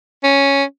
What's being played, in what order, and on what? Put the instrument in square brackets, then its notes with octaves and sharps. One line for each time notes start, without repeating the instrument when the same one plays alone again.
[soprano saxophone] C#4